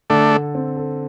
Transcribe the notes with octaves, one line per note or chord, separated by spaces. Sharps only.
D3 A3 D4
A4
C4
A4